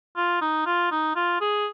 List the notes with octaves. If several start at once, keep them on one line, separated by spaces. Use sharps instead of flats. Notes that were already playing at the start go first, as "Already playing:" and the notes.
F4
D#4
F4
D#4
F4
G#4